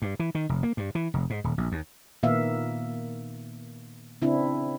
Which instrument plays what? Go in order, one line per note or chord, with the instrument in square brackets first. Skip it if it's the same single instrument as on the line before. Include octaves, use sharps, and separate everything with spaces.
[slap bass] G2
E3
D#3
F1
A#3
G2
E3
F1
G#2
D#1
A#1
D#2
[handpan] A#2 D#3 A#3 B3 E5 F5
C#3 C4 D4 E4